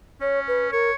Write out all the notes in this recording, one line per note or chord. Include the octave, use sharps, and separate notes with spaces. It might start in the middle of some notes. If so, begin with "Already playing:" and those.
C#4 C#5
B4
A#4 C#5